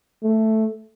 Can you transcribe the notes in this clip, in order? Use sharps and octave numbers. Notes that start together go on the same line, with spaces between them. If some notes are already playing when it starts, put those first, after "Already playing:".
A3